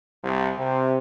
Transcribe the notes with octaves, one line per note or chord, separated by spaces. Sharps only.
C2
C3